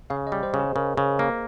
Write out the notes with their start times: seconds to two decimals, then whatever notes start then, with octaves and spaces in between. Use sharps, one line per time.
0.10 C#3 F5
0.27 D#5
0.32 G3
0.43 C5
0.54 C#3
0.59 G#4
0.76 C#3 A#4
0.97 C#3
1.19 A#3